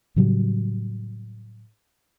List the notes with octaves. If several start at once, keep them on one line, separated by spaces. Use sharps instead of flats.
A2 C#3 F#3 G3